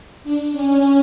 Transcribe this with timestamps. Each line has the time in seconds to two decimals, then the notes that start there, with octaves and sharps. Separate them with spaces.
0.24 D4
0.53 C#4